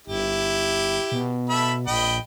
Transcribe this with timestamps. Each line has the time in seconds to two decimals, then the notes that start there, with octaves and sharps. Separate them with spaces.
0.07 G1 E4 G4
1.12 B2
1.50 A4 E5 B5
1.87 A#1 D#5 G5 B5